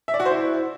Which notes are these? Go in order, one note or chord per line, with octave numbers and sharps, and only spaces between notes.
E5
D5
F#4
C5
E4